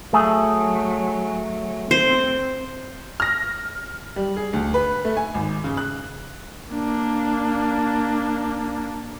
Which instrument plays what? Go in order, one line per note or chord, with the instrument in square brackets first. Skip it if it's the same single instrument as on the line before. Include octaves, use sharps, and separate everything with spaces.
[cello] F#3 [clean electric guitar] A3 G#4
[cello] C4 [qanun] C5
[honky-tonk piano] F6 A#6
[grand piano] G3
G#4
D2
B4
A3
G#5
G#1
C#3
F#6
[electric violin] A#3 D4